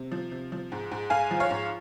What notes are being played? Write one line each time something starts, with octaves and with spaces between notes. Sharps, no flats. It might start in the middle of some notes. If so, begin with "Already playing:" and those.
Already playing: C3
F3
C3
F3
G#2
G#2
G#2 F5 G#5
F3
C#5 F5
G#2